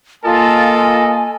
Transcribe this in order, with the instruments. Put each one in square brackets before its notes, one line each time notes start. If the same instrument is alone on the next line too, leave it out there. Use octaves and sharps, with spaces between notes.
[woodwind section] A#3 A5 [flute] F4 [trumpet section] A4 A#4 D#5 [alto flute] G#5